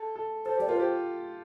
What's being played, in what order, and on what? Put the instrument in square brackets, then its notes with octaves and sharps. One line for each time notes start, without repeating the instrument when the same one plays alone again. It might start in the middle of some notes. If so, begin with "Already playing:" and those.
Already playing: [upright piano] A4
A4
[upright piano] A4 [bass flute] C5
[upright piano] G4 [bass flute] D5
[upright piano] F4 [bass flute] A#4
[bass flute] C5
[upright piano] G4